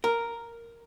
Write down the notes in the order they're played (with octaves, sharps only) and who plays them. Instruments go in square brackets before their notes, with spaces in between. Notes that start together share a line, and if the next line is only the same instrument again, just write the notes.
[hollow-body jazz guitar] A#4